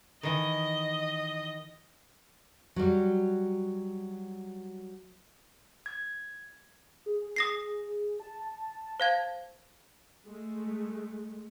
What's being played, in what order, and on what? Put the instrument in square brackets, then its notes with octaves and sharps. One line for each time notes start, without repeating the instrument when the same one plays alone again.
[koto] D#3 E3 [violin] D#5
[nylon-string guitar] F#3 G3
[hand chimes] G#6
[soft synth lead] G#4
[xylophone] D#6 A#6 C7
[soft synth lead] A5
[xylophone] C5 F5 G#6
[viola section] G#3 A3